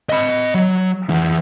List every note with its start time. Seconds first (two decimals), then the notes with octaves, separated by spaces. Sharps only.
0.09 D#5 B5
0.55 F#3
1.10 E3 G#4